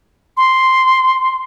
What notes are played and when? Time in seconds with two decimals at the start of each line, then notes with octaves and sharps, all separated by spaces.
0.37 C6